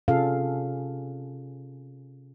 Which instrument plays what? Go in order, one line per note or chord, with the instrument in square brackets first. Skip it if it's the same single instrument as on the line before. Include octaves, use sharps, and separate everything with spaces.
[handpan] C3 C#4 F4 G#4 A4 F5